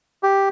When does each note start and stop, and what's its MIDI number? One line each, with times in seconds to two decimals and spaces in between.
0.23 0.49 67